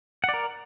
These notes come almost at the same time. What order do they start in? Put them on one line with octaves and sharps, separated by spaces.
F#5 D5 A#4